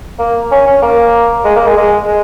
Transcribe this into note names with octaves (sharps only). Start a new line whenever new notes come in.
A#3
C#4
C#4
A#3
G#3
A#3
G#3
G#3
G#3